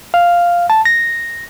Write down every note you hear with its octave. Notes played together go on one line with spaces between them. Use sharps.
F5
A5
A#6